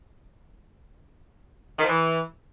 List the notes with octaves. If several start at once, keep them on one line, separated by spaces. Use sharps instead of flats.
D#3
F3
E3